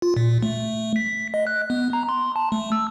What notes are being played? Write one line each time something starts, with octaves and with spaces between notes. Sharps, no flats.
F4
A#2
A3
B6
D#5
F#6
B3
A#5
C6
A5
A3
E6